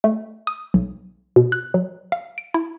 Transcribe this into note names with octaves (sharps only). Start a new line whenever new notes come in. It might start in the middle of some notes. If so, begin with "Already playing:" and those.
A3
D#6
B1
B2
F#6
F#3
F5
D7
E4